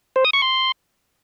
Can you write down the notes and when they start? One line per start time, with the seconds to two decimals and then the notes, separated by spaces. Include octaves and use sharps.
0.16 C5
0.25 D#6
0.33 C#6
0.42 C6